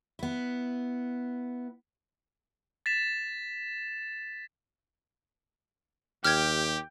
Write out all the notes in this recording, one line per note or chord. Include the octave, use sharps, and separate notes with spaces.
B3 E4
A6 B6 E7
D#2 G4 G5 F6 G#6